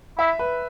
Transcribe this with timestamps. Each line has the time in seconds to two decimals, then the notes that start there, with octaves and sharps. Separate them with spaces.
0.18 E4 E5
0.39 B4